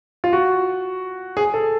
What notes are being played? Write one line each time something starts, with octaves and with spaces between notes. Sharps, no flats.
F4
F#4
G#4
A4